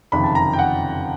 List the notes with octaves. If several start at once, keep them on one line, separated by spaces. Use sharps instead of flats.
F#1 F2 C3 D#3 B5
A5
A#5
G5
F#5